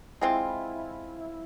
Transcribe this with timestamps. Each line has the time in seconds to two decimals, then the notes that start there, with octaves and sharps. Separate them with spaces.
0.21 G#3 C4 E4 F4